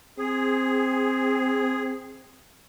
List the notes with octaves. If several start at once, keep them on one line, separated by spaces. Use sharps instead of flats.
C4 G#4